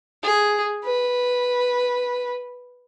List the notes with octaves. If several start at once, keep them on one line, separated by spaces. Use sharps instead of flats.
G#4
B4